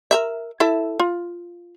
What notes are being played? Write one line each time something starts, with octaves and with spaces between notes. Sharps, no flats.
A#4 B4 E5
E4 A4 E5
F4